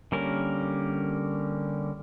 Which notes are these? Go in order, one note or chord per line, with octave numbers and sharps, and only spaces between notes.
D3 G3 A#3 C#4 A#4